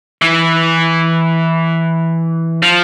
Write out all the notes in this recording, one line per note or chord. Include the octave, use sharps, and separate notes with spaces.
E3
F3